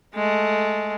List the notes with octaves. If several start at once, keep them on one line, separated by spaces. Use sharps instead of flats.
G#3 A3